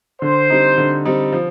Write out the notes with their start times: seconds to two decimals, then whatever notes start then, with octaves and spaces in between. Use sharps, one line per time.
0.22 D3 C5
0.50 G3 C4 D#4
0.78 D3
1.05 G3 C4 D#4
1.32 F3